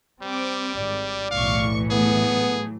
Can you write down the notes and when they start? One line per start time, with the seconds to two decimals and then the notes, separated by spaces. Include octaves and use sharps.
0.22 G3 C4 D6
0.77 G#1 D5
1.31 B1 E2 A2 E3 F5 C#6
1.91 F#3 A3 B3 G#4